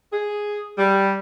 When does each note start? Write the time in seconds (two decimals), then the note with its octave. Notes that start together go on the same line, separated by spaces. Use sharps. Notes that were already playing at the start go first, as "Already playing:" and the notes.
0.12 G#4
0.78 G3